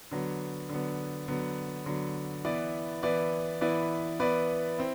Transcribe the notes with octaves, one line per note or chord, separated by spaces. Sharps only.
D3 F#3 B3
D3 F#3 B3
D3 F#3 B3
D3 F#3 B3
E3 B3 E4 B4 D5
E3 B3 E4 B4 D5
E3 B3 E4 B4 D5
E3 B3 E4 B4 D5
C4 E4